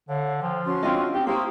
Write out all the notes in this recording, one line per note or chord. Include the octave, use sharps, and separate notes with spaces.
D3 C#5 F5
F3 G5
C#4 F#4 C6
C4 D4 F4 D#5
D#4 G4
A#3 E4 G4 C5 C#6 D#6 E6